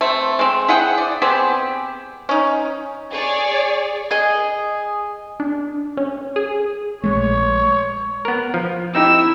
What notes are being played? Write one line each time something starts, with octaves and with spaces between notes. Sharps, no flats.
A3 C4
G#3 C4
E4 G#4 F#5 G5
D5
B3 C4 G4 G#4
C#4 D#4
G#4 C#5 D5
G#4 D#5
D4
C#4
G#4
A#1 G#3 A3 C#5
B3 A#4
F3
C4 D#4 E4 G4 E6